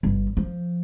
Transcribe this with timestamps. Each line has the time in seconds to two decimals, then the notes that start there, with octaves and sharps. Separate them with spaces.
0.03 G1
0.37 F3